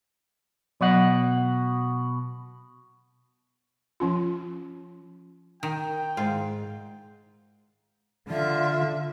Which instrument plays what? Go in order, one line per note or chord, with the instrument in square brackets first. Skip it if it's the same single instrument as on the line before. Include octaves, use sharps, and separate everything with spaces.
[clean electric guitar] B2 F#5 [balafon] F#3 D#5
[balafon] F3 C#4 F4
[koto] D#3 [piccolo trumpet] G5
[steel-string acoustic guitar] G#2 [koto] F4
[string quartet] D3 E5 [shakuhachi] F4